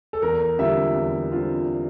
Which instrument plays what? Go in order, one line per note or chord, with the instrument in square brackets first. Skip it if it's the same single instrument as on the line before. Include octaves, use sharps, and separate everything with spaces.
[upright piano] A4
E2 A#4
D3 G3 C4 F4 E5
E2
D3 G3 C4 F4